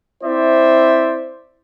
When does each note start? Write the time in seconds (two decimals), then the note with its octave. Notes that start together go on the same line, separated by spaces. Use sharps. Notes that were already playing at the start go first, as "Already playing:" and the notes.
0.24 C4 E4 C5 D5 E5